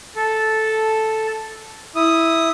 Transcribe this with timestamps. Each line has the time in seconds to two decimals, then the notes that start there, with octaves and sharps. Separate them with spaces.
0.16 A4
1.96 E4 D#6